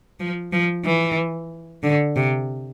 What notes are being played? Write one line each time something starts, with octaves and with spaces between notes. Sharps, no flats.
F3
F3
E3
D3
C3